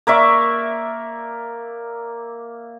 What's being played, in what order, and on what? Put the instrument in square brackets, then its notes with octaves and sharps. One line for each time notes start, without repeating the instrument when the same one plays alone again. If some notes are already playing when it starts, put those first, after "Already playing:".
[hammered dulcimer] A#3 D5 E5 C#6